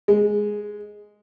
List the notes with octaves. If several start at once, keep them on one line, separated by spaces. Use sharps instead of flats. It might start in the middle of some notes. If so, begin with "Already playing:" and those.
G#3